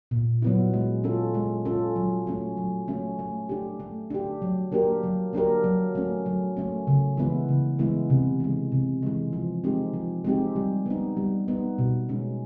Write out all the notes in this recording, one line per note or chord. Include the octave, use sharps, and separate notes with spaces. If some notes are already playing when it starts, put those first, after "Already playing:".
A#2
F#3 B3 E4
G#3
C#4 F4 A4
G#3
C#4 F4 A4
F#3
A3 C#4
F#3
A3 C#4
A3
D4 G4
A3
D4 G4
F#3
A#3 D4 G4 A#4
F#3
A#3 D4 G4 A#4
F#3
A3 C#4
F#3
A3 C#4
C#3
E3 G#3 B3 E4
C#3
E3 G#3 B3 E4
C3
E3 G#3
C3
E3 G#3
F3
G#3 C4 D#4 G4
F3
G#3 C4 D#4 G4
G3
B3 D#4
G3
B3 D#4
B2
G#3 C#4